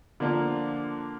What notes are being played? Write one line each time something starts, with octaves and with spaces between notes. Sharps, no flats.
D3 F3 A#3 D4 F4